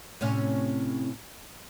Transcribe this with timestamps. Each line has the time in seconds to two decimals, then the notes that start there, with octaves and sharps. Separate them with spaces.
0.21 A2 C3 C#4